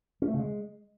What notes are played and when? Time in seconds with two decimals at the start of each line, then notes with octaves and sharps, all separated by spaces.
0.22 C#4
0.28 A3
0.34 C#3
0.39 G#3